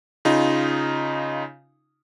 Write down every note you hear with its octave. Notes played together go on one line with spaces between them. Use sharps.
C#3 D#4 F4